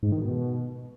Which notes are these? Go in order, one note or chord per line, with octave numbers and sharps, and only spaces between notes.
G#2
D#3
B2